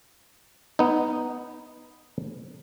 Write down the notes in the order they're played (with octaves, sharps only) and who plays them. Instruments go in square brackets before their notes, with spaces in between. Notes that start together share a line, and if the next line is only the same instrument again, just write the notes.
[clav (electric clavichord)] B3 D#4